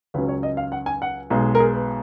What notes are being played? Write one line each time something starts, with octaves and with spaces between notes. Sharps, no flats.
C#2 C#3 F#3 C#4 B4
C#5
D#5
F5
F#5
G#5
F#5
B1 B2 G#3
A#4
G#4
B4